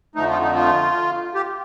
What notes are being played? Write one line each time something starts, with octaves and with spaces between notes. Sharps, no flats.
F2 D3 F3 A3 D#4
F4
D#4
F4
G4